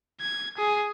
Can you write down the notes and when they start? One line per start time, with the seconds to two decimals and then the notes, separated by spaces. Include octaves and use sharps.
0.20 G#6
0.58 G#4